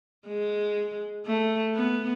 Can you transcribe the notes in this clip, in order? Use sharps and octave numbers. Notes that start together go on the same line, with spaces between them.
G#3
A3
B3